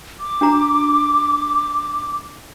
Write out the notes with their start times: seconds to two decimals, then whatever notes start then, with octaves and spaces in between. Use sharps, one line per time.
0.20 D6
0.41 D4 F#4 A#5